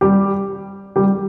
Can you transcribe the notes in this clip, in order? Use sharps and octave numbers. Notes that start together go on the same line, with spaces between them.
G3 G4
G3 G4